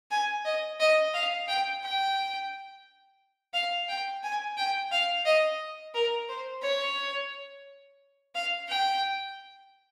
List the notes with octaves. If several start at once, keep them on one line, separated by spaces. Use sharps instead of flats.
G#5
D#5
D#5
F5
G5
G5
F5
G5
G#5
G5
F5
D#5
A#4
C5
C#5
F5
G5